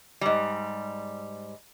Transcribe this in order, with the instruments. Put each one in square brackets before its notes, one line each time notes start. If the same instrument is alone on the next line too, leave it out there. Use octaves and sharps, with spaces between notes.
[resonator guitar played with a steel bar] G#2 G3